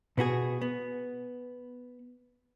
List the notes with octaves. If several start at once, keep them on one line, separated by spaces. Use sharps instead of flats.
B2 B3 F#4 G#4
B3